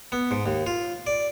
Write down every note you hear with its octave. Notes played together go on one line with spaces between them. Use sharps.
B3
G#2
D#2
F4
D5